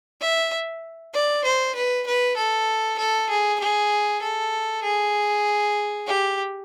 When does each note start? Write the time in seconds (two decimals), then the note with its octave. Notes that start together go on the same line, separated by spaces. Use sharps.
0.21 E5
1.13 D5
1.44 C5
1.75 B4
2.07 B4
2.37 A4
2.99 A4
3.30 G#4
3.60 G#4
4.22 A4
4.83 G#4
6.07 G4